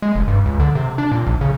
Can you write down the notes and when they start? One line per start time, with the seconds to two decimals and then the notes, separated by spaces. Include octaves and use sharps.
0.02 G#3
0.15 F1
0.28 G2
0.46 C#2
0.60 D3
0.75 C3
0.98 D4
1.12 A#2
1.27 A#1
1.41 C#3